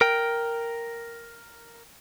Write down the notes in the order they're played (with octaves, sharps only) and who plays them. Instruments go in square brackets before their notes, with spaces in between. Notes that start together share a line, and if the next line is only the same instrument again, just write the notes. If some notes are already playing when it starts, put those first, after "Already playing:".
[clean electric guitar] A#4 G5